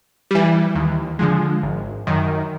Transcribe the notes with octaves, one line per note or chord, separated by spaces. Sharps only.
E3 G3
D#2
D3 F3 G#3
G#1
F#2 D#3